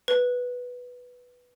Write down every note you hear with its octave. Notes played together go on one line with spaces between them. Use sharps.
B4